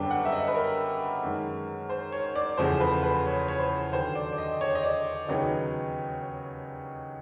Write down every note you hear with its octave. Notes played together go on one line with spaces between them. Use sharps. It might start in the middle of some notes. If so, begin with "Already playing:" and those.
Already playing: F#2 D3 G3 B3 D4 G5
F#5
E5
D#5
B4
A#4
F#2 D#3 G#3
C5
C#5
D5
E2 C#3 F3 A3 C5
B4
B4
C#5
C#5
C5
D#2 D3 F#3 C5
D5
D5
D#5
C#5
D#5
D5
D#2 C#3 F#3 B3 D#4